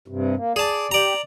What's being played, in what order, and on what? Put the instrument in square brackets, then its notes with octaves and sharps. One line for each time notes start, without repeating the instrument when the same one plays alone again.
[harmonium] G2 C3
A#3
[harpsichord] G#4 A5 [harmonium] D5
[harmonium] G4 [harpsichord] D5 A#5